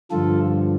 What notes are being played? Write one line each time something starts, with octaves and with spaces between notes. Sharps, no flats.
G2 D3 F3 F4 A4